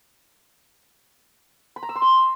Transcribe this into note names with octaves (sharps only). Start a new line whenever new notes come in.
B5
A#5
E6
C6
E6